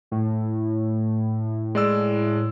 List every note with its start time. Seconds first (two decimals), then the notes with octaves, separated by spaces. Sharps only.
0.11 A2
1.75 G#3 D5 E6